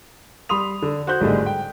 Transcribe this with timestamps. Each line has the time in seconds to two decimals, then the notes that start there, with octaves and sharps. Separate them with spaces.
0.49 G3 B5 C6 D#6 F7
0.82 D3
1.07 F#4 C5 F#6 G6
1.21 G#1 A2 D3 G3 G#3
1.46 G5